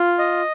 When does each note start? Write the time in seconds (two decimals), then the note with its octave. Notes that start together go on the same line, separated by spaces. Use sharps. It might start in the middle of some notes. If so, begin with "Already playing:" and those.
Already playing: F4
0.19 D#5